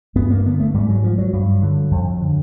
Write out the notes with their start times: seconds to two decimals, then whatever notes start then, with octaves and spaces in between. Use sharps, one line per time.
0.15 G2 B3
0.31 A#3
0.46 D3 B3
0.60 A3
0.74 G#2 G3
0.90 F#3
1.04 F3
1.18 F#3
1.33 G2
1.62 D3
1.91 F2
2.21 D3